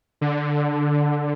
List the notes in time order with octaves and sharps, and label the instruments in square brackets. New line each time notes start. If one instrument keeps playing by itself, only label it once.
[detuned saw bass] D3